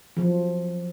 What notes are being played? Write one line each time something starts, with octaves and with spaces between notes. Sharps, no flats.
F3 F#3